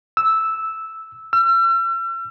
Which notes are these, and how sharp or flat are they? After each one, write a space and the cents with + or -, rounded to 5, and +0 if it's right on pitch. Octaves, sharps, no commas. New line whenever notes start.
E6 -5
E6 +45